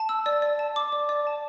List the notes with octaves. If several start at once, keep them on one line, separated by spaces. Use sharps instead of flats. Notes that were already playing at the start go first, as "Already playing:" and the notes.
Already playing: A5
E6
D5
D5
A5
D6
D5
D5
A5